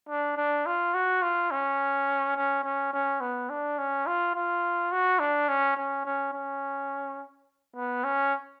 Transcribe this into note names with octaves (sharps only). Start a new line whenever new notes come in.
D4
D4
F4
F#4
F4
C#4
C#4
C#4
C#4
B3
D4
C#4
F4
F4
F#4
D4
C#4
C#4
C#4
C#4
B3
C#4